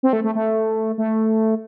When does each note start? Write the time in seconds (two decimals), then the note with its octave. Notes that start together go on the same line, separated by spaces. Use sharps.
0.03 C4
0.13 A3
0.24 A3
0.35 A3
0.98 A3